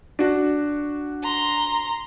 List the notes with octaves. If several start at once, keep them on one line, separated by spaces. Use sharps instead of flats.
D4 F#4
A#5 C6